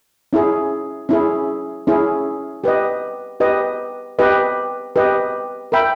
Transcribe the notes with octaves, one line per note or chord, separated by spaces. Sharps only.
C#4 E4 G#4
C#4 E4 G#4
C#4 E4 G#4
G4 B4 D#5
G4 B4 D#5
G4 B4 D#5
G4 B4 D#5
A#4 E5 G5 B5